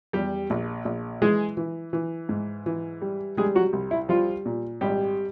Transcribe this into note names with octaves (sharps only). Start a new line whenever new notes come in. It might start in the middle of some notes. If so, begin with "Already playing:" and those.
E2 G3 G4
A#1
A#1
E3 G#3 G#4
E3
E3
G#2
E3
G3
G3 G#3 G#4
F#3 F#4
C2
E4
F3 G3 F4
A#2
G#1 G3 G4